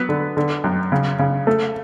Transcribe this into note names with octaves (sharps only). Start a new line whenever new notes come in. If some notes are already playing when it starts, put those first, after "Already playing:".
Already playing: F#3 B3 B4
D3
D3
F#2
C#3
C#3
A3